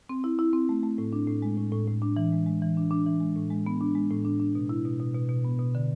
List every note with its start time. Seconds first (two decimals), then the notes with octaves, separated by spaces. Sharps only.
0.09 C4
0.24 E4
0.39 E4
0.53 C4
0.69 A3
0.83 A3
0.98 A2
1.13 D4
1.28 A2
1.42 G#3
1.58 A2
1.72 A2
1.87 A2
2.02 D4
2.17 E3
2.32 G#3
2.46 G#3
2.62 E3
2.77 D4
2.91 D4
3.06 E3
3.21 G#3
3.36 A2
3.50 G#3
3.66 B3
3.81 D4
3.95 G#3
4.11 A2
4.25 D4
4.40 D4
4.55 B2
4.69 E4
4.85 B2
5.00 B2
5.15 B2
5.29 B2
5.44 B3
5.59 B2
5.75 D3